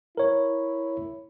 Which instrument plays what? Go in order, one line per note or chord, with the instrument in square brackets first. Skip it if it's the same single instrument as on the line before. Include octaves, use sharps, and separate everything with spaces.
[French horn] E4 [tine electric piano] A#4 C#5